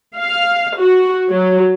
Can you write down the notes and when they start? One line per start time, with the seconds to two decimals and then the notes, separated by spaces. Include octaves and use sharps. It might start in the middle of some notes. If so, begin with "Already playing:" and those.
0.18 F5
0.80 F#4
1.29 F#3